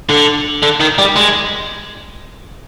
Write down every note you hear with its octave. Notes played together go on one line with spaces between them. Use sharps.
D3
D3
D#3
G3
G#3